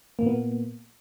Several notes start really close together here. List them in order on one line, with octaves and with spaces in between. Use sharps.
A#3 A#2 B3